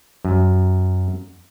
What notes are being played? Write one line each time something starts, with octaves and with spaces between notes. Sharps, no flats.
F#2